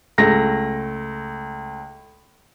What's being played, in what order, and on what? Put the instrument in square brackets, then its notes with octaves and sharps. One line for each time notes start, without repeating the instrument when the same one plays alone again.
[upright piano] C#2 A3 A#6